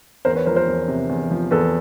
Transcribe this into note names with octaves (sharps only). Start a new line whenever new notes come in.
E2 A#4 C5
B4 C#5
F3 A#4 C5
A#4 C5
E2
C3
E2
F3
E2 A4 B4